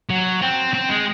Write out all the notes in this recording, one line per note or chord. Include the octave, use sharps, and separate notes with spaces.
F#3
C4
C4
G#3